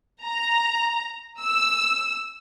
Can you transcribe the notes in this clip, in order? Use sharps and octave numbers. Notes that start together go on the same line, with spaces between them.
A#5
E6